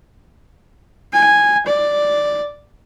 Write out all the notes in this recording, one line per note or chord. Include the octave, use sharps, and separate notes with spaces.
G#5
D5